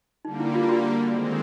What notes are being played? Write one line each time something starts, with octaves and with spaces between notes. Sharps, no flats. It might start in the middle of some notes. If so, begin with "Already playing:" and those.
D3 G3 A#3 D#4
E4
F4
F#4
D#3 G#3 C4